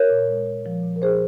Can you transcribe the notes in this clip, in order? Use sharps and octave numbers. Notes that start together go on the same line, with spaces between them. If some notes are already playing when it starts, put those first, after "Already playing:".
Already playing: A#4 C#5
A#2
G#3
A#2
F3
A#2
A#4
A#2 G#4 C5